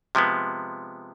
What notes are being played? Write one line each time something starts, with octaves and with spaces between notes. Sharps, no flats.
C3 F3 G#3 B3